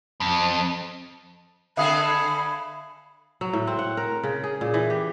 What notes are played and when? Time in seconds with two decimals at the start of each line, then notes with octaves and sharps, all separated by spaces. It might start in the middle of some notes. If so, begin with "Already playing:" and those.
0.20 F2
1.77 D3 G#4 A4 E5 F5 B5 D#6
3.41 F#3
3.53 A2
3.67 C4
3.79 F#5
3.97 A#4
4.23 C#3
4.44 G#4
4.61 A#2
4.74 E3
4.90 G4